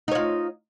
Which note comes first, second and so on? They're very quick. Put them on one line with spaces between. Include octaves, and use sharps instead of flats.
D#4 C#5 F4